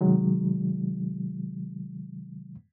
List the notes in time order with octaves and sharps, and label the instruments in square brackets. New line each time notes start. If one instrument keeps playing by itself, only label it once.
[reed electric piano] C3 D#3 F#3 G#3